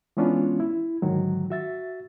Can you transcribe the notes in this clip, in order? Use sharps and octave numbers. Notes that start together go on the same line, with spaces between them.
E3 G#3 B3 C#4 D4 F4
E4
G#2 D3 D#3 F#3
F#4 E5 A6